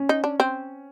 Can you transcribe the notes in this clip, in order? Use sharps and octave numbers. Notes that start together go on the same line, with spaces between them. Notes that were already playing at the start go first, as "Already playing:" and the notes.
Already playing: C#4
D#4
D4
C4